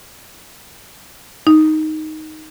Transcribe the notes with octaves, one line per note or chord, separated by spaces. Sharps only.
D#4